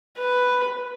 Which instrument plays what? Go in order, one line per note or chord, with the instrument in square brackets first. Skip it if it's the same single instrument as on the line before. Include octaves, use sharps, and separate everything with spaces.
[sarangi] B4